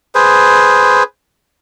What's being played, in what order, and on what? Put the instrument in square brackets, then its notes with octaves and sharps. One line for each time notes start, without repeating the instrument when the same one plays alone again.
[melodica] G#4 B4 C5